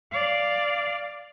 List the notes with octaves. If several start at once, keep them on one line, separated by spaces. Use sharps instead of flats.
D5 F5